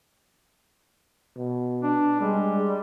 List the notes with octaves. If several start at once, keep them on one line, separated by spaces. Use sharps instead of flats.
B2
D4
G3 G#3